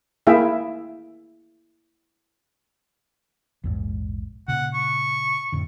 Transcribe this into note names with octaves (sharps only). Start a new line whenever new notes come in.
A#3 E4 G#4 E5 F5 G5
A#1 E2 G#2
A#2 C#3 F#5
C#6
F2 A2 D3